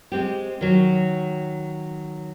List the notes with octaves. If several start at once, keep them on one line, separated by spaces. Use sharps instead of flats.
G#3 C4 G4
D#3 F#3